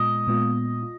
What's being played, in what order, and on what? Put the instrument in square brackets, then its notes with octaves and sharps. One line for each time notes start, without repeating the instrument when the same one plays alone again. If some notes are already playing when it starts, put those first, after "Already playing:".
Already playing: [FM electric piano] A#2 G#3 B3 F4 [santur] D#5
[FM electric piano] A#2 G#3 B3 F4
F4